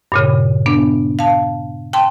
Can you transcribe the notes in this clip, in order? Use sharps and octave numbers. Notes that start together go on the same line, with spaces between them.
G2 A#2 C#3
B3 D4
F5 A5
G5 A5 C6